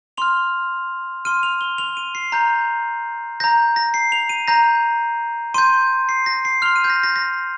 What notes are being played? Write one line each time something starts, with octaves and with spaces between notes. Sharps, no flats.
C6 F6 F7
C6 F6 D#7
F7
G7
F7
D#7
C7
A#5 G6
A#5 G6 A#6
A#6
C7
F7
D#7
A#5 G6 A#6
C6 G6 D#7
C7
A#6
C7
C6 F6 F7
D#7
G6
A#6
A#6
A#6